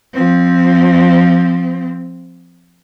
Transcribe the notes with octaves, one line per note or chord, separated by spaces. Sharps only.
F3 C4